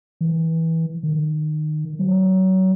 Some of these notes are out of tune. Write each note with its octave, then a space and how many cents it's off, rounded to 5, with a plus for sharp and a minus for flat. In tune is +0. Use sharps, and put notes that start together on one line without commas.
E3 -20
D#3 -25
F#3 +25